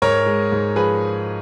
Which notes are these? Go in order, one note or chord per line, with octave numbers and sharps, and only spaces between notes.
G#2 A#4 C#5
G#3
G#2
F3 G#4 B4